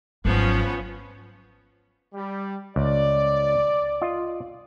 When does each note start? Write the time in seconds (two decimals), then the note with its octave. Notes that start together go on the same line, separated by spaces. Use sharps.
0.25 G#1 F3 F#3 B3 C#4
2.14 G3
2.76 C#2 D5
4.01 F4 D#5